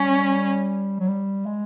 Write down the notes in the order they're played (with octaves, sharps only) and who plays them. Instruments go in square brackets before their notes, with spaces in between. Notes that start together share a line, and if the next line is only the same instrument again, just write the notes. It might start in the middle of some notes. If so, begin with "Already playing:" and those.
Already playing: [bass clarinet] G3 [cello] C#4
[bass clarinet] F#3
G3
G#3